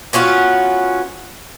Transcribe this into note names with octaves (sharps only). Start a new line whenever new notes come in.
B3 C#4 F4 F#4